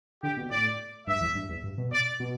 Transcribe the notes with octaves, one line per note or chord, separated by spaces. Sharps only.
D3 G4
B2
A2 D5
G2 E5
E2
G2
E2
G2
B2
D5
B2